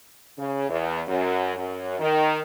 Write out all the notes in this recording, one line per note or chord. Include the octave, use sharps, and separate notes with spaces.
C#3
E2
F#2
F#2
D#3